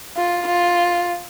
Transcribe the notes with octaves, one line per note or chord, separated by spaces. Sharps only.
F4
F4